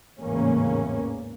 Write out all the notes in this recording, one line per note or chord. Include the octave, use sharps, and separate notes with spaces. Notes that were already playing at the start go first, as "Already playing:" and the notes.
G#1 E2 A2 C#3 A#3 C#4